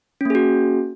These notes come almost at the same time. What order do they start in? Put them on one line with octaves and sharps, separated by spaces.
C#4 A#3 G#4 F#4